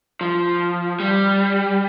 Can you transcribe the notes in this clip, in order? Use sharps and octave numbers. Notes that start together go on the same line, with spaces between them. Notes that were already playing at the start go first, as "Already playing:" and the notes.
F3
G3